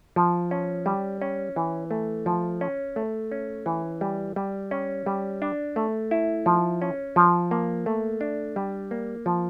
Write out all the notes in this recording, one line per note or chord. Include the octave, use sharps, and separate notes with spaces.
F3
C#4
G3
C#4
E3
A3
F3
C#4
A3
C#4
E3
G3
G3
C#4
G3
D4
A3
E4
F3
C#4
F3
A#3
A3
D4
G3
A#3
F3